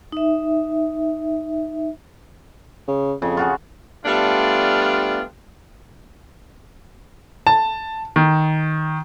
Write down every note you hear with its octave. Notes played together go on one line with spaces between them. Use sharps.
D#4 E5
C#3
F2 C#3
F4 F#4 G#4
G3 A3 B3 D4 F4
A5
D#3